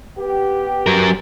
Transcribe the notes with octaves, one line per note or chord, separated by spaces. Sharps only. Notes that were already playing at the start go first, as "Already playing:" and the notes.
B3 G4
F#3 A#4